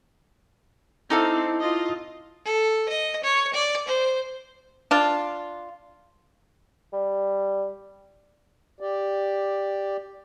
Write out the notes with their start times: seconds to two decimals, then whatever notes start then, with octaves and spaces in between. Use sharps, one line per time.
1.10 C4 D#4 E4 A4 F5 D6 E6
1.60 F4 D#5
2.45 A4
2.89 D#5
3.24 C#5
3.54 D5
3.88 C5
4.91 D4 F4
6.93 G3
8.81 G4 D5